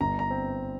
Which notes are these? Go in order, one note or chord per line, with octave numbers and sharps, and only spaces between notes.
G1 A#5
A#5
C4